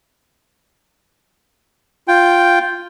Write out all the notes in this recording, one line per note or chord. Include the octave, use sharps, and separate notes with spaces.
F4 G5